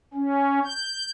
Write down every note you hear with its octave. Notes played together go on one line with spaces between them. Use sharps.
C#4
G6